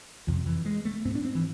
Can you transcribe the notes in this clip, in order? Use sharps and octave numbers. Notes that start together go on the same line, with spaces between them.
F2 C3 F3
E3
G#3
A3
G#2 C4
D4
C4
E3